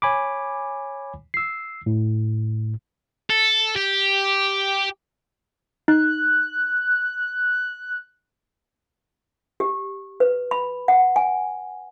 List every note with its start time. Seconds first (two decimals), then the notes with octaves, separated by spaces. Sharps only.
0.02 C#5 G#5 B5 D6
1.34 E6 C7
1.86 A2
3.30 A4
3.76 G4
5.88 D#4 F#6
9.60 G4
10.20 B4
10.51 B5
10.88 F#5
11.16 G#5